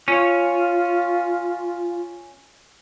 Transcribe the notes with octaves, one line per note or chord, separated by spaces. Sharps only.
C#4 F4 C#5